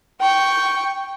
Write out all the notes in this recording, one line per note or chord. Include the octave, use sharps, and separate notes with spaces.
G5 C#6